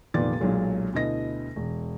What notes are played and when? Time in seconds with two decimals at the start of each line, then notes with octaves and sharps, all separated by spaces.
0.14 F1 A#2 D#3 B3 D5 A6
0.40 B1 A#2 F#3 G#3
0.93 D2 B2 E4 D#5 A#6
1.56 E1